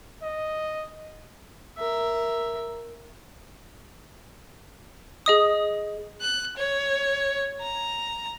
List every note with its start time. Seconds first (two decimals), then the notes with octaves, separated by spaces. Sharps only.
0.22 D#5
1.78 A#4 E5
5.26 G#4 D#5 D#6
6.20 F#6
6.57 C#5
7.61 A#5